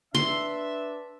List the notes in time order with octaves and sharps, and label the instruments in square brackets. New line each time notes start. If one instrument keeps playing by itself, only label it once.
[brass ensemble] D4 B4 E5 [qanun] C6